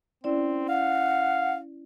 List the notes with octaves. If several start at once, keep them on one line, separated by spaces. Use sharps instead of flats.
C4 C#4 E4 D5
F5 F#5